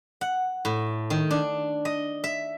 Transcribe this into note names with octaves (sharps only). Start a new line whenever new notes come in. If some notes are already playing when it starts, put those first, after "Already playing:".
F#5
A2
D#3
D4
D#5
E5